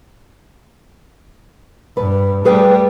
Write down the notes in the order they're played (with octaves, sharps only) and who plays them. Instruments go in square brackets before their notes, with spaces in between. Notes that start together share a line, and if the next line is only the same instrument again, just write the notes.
[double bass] G2 [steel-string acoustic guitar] B4
[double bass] G3 A3 [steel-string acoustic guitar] G#4 B4 G5